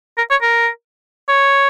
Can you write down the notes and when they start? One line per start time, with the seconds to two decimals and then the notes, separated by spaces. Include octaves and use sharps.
0.18 A#4
0.31 C#5
0.42 A#4
1.29 C#5